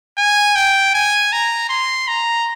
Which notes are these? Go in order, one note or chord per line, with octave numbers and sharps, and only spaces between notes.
G#5
G5
G#5
A#5
C6
A#5